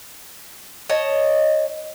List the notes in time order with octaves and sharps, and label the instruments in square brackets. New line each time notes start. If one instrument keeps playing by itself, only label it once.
[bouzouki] C#5 D#5 A5